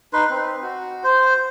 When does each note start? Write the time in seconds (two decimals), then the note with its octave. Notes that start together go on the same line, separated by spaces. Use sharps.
0.13 D#4 B4 C6
0.30 C4
0.63 F#4
1.04 C5